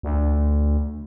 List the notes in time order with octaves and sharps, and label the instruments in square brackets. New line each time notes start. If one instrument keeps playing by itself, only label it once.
[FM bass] D2